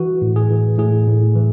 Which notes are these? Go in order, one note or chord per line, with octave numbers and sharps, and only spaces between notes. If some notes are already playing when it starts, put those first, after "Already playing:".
Already playing: E3 F#4
A2
G#4
E3
A2 G#4
A2
E3